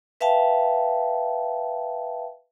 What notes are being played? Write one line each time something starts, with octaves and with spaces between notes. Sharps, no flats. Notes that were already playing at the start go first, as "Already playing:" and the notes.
B4 E5 F5 G5 A5